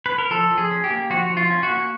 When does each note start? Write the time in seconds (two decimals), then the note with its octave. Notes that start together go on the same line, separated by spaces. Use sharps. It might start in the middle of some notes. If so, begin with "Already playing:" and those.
0.06 B4
0.18 A#4
0.30 F3 A4
0.51 F3
0.58 G#4
0.71 C#4
0.84 G4
0.90 A#3
1.10 F3 F#4
1.30 F3
1.37 F4
1.50 C#4
1.63 F#4
1.70 A#3